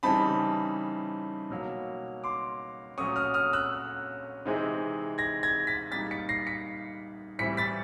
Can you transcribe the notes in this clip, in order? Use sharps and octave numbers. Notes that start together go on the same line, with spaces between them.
C#3 E3 G3 C4 D#4 A5 B5
B2 F#3 A#3
C6 D6
A#2 F#3 A3 C#4 C#6 D#6
D#6 F6
D#6 F6
E6 F#6
C3 E3 G#3 C4 D#4
G#6 A#6
G#6 A#6
A6 B6
A#2 G3 A#3 D#4 A6 B6
B6 C#7
A#6 C7
B6 C#7
A2 E3 G3 C4 E4 B6 C#7
A6 B6